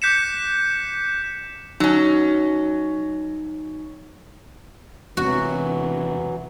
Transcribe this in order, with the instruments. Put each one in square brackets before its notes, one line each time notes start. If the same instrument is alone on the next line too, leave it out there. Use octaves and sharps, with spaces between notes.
[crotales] D6 F#6 G6 B6 C#7 E7
[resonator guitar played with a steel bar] F#3 C#4 [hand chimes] D#4
[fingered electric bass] E1 C3 [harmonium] E3 F#3 [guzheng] F#4